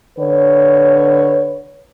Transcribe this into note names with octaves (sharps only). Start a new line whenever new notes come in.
D3 B4 C#5